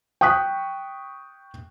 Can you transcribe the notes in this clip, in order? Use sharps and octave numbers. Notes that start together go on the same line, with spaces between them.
G5 C#6 D#6 F#6 B6